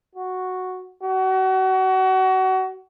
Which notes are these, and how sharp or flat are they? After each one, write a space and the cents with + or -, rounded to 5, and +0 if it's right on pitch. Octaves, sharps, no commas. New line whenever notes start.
F#4 -5
F#4 +30